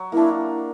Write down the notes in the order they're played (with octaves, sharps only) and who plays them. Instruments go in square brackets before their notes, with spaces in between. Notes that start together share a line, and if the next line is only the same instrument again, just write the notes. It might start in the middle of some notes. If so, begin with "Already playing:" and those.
Already playing: [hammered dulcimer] F#3
[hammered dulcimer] A#3 D4 [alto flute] E4